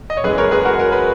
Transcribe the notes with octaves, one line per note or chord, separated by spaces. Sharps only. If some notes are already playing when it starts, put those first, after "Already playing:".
D#5
C#5
F#2 E3 G#3 G#4 B4
A#4 C#5
G#4 B4
F#4 A#4
A#4
B4